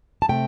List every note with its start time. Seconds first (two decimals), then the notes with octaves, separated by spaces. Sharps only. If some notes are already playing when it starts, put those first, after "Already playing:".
0.22 A5
0.29 C3 A3 G5